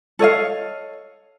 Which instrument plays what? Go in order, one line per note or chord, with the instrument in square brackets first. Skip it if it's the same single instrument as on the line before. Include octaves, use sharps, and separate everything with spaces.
[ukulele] A4 C#5 D#5 F5